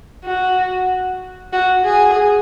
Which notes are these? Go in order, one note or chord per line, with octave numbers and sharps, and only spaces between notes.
F#4
F#4
G#4